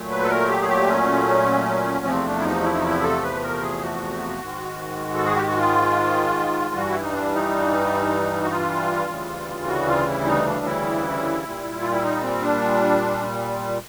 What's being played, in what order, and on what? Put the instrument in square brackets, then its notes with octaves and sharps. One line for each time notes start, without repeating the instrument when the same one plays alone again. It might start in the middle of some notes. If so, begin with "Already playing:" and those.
Already playing: [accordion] A#2 F#3 A3
B4
A4
A#4
G4
G#4
G4
C#4
E2 C3 F3 A3 C4
D4
E4
D#4
E4
D#4
E4
A4
B4
A#4
G#4
F#4
G#2 D#3 G#3
A4
G#4
G4
F#4
F4
G2 E3 G3 F#4
E4
D#4
D4
D#4
F#4
F4
D2 C#3 E3 G3
F#4
F4
E4
D#4
D4
E4
A#2 G3
F4
E4
D#4
C4
D4